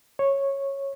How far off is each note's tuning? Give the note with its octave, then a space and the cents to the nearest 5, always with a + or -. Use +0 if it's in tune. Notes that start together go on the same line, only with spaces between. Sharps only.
C#5 -10